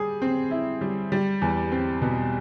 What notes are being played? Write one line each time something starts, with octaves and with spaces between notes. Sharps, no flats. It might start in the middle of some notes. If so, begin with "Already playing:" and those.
Already playing: G3 G#4
C4
E4
G3
G3
E2
C4
B2